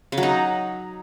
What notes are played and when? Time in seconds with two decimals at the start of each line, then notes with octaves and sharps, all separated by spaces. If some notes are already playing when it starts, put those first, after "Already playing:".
0.12 C#3
0.18 F#3
0.23 D#4